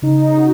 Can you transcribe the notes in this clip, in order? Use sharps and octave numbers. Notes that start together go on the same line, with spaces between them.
C#3 D#4
C#3 F#4